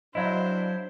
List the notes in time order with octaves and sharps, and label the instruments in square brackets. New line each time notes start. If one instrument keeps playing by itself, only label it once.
[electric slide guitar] F#3 E4 [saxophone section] D4 [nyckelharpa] C5 [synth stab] D#5 F5 B5